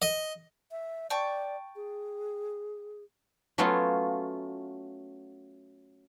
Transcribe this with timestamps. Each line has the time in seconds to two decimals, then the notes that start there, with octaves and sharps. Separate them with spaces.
0.02 D#5
0.71 E5
1.10 D5 G5 A5 C#6
1.76 G#4
3.58 F#3 A3 B3 C#4 F4